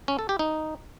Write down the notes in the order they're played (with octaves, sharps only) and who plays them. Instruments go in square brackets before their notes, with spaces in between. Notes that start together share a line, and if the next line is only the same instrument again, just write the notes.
[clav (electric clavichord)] C#4
A4
G4
D#4